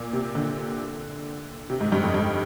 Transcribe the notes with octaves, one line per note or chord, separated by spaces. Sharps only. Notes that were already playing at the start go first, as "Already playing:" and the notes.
Already playing: A#2
C3
D3
C3
G#2
G2
F2
G2